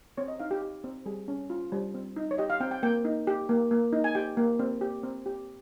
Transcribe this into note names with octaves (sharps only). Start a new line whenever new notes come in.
C4 C#5
D#5
D#4 F5
G4
G4
C4
G3 G#4
C#4
F4
G3
C4
D#4
C#5
G4 D#5
F5
C4 G5
G5
A#3 G5
D#4
G4
A#3
A#3
D#4
G#5
G4 G5
A#3
C4
G4
C4
G4